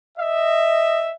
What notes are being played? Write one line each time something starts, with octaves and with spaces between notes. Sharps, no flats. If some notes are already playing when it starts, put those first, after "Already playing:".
D#5 E5